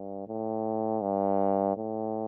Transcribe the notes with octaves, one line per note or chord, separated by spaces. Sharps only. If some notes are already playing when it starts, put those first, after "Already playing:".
Already playing: G2
A2
G2
A2